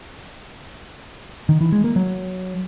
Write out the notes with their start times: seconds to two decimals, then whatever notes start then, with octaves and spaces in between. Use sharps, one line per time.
1.49 D#3
1.61 E3
1.72 G#3
1.84 A#3
1.96 F#3